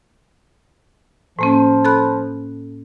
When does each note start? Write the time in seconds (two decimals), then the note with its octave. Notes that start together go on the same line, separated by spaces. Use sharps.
1.39 A2 F3 A#3 C#4
1.85 A4 B5 F#6